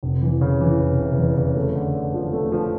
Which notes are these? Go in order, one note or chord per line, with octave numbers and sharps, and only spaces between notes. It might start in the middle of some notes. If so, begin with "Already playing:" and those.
F1
E3
C#3
E3
F1
F1
E2
C#3
A3
D3
D3
F3
A3
F3